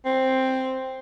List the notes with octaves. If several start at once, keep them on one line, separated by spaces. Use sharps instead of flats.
C4